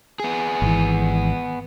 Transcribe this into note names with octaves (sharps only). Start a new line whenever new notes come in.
B3 G#4
G#1 E3